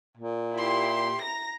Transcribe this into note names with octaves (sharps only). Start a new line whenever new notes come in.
A#2
E4 G4 C6
A#5 A#6